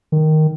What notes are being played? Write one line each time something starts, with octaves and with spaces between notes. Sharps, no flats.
D#3